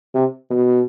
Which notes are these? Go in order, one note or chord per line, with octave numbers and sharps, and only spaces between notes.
C3
B2